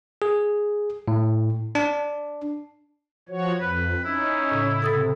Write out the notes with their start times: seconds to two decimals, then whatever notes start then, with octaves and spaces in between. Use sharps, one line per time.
0.22 G#4
1.08 A2
1.75 D4
3.29 F3 F#4 C#5
3.60 F2 B4
4.05 C#4 D#4 E4
4.51 A2 C#3
4.82 C3 A4 D#6 A6